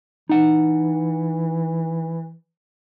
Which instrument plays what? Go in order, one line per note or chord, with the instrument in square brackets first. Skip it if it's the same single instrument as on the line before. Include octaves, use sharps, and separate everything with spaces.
[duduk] E3 [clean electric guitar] D#4 F#5